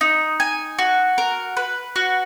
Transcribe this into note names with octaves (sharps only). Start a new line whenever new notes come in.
D#4
G#5
F#4
A#4
B4
F#4